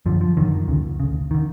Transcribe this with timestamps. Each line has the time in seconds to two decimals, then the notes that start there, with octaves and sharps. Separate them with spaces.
0.06 F#2 D3 F3
0.21 F3
0.37 F#2 D3 D#3
0.68 D2 C#3
1.00 D2 C#3
1.31 D3 D#3